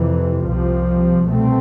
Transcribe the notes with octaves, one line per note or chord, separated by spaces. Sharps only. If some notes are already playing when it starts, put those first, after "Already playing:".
Already playing: F2 C3 E3
C2 C3 F3
C2 B2 A3 C4